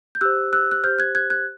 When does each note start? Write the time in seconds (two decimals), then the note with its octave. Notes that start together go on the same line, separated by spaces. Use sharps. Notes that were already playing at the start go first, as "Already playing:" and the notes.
0.15 G6
0.21 G4 C5 E6 F#6
0.53 E6 F#6
0.71 F#6
0.84 G4 C5 F6 G6
0.99 F#6 G#6
1.15 F#6 G#6
1.30 F#6 G#6